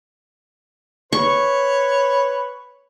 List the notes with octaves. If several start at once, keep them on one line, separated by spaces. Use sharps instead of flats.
B4 C#5 C#6